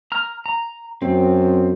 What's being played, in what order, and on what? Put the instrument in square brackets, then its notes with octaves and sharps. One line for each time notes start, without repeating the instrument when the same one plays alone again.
[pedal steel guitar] A#5 F6
A#5
[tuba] F#2 [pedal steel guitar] C4